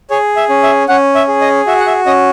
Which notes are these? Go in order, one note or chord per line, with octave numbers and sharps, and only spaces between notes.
G#4 C#5
E5
C#4
E5
C#4 F#5
E5
G#4
D#5
F#4 E5
F#5
E5
C#4 D#5